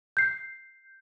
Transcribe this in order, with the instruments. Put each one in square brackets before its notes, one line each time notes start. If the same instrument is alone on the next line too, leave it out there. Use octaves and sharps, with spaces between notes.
[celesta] G6 C7